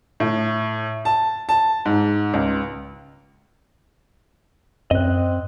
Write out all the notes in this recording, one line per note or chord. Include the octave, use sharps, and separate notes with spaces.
A2
A5
A5
G#2
C#2
F#2 C4 D#5 F#6